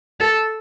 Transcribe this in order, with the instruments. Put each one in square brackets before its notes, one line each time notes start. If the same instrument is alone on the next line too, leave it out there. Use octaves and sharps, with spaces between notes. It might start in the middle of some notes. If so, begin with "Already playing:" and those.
[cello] A4